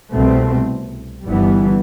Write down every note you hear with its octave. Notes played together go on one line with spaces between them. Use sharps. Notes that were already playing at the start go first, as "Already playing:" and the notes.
C2 B2 A3 C4
G1 G2 E3 G3 B3